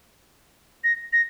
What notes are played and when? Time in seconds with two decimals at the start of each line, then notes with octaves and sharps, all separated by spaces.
0.84 A#6
1.13 A#6